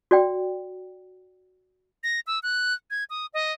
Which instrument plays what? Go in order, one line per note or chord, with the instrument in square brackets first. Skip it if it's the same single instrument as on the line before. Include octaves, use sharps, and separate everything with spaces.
[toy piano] F#4 D5 G5
[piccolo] A#6
E6
F#6
G#6
D#6
D#5